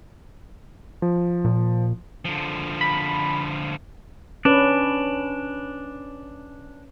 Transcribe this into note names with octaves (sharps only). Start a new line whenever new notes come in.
F3
A#2
D3 F3
B5
C#4 D4 B4